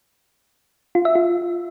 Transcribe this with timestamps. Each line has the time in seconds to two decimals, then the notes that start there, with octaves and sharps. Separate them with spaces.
0.95 F4
1.05 E5
1.15 F4